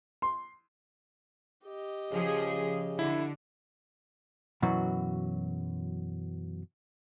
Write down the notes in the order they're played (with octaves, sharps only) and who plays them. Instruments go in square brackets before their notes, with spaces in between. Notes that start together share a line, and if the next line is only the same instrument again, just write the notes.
[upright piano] C6
[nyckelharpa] G4 D#5
[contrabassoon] C#3 [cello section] F3 G#4
[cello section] D3 [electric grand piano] E4
[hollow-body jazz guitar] F#2 B2 E3 F#3 F#4